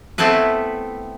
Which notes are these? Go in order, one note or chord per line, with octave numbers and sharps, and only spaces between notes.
A3 B3 C4 E4 A4 B4